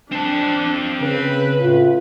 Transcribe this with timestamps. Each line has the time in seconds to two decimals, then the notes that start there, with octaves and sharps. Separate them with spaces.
0.12 C4 D4 A5
1.00 C#3 B4
1.60 A2 F4